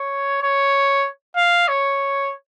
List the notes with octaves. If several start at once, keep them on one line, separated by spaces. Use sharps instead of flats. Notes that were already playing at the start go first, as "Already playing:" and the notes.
Already playing: C#5
C#5
F5
C#5